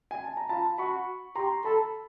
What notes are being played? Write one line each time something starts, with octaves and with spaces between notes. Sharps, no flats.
G#5
A5
A#5
F4 A5 B5
F#4 B5 C#6
G4 A#5 C6
A4 A5 B5